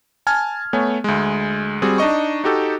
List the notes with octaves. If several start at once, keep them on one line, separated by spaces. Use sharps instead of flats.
G#5 A5 F6 G#6
A3 B3 C#5 G#5
D2 G#3
G3 C4 F#4 G#4
D4 D#4 D#5 C#6
D#4 F#4 G4 A4